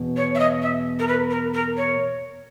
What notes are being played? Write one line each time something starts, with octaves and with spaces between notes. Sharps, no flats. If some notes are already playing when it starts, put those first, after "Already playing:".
Already playing: E2 B2
C#5
E5
D#5
E5
A#4
B4
A#4
A#4
C#5